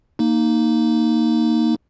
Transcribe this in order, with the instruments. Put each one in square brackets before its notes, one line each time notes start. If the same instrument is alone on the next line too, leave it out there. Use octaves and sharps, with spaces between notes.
[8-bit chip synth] A#3 D#4